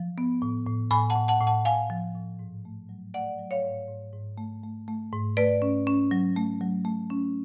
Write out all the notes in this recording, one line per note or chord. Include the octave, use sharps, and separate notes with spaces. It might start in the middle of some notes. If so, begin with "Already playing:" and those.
Already playing: F3
B3
A2
A2
A2 G#5 B5
F#5 A5
A2
F#5 A5
A2
F#5 A5
A2 F5 G#5
F3
A2
G#2
A3
F#3
A3 D5 F#5
F#3
C#5 F5
G#2
G#2
G#2
A3
A3
A3
G#2
A3 B4 D5
C#4
C#4
F#3
A3
F#3
A3
C#4